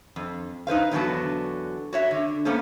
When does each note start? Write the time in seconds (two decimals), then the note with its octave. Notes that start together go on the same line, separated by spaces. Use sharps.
0.16 F2
0.67 D#4 B4 C5 F5
0.91 E2 D3 F#3 B3 F#4 A5
1.93 F#4 C#5 E5
2.11 D3
2.45 A#3 B3 C#4 A4 C5